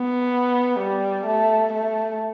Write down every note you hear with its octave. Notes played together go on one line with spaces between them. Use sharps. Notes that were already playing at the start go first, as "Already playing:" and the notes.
Already playing: B3
G3
A3
A3